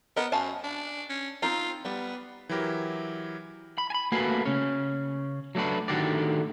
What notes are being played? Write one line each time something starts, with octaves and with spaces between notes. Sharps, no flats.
B3 A#4 D#5
F#2 F5 G#5 A5
D4
C#4
C4 D#4 F4 A#5
G3 B3
E3 F#3 E4 G4 A#4
B5
G#5 B5
A3 A#3 F#4 B4 F5 G#5
C#3 C#4
F#3 A3 D4 F#4 B4
A2 D3 D#3 F#4 G4 D5